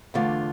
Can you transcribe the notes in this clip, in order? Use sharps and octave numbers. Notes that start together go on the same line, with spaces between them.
E2 D3 A3 D4 F4